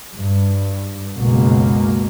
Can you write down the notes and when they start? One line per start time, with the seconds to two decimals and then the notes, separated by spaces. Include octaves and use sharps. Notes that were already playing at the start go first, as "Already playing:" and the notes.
0.13 G2
1.17 F#1 C#2 B2 A#3